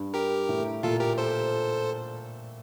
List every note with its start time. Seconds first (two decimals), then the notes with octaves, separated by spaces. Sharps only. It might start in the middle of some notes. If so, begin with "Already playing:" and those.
Already playing: G2
0.14 G4 A#4
0.49 A2
0.83 A#2 F4 A4
1.00 G4 A#4
1.18 A4 C5